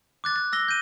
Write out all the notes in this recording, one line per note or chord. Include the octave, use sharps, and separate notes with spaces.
D6 F#6 A6
A6
E6 A#6 G7
G6 D#7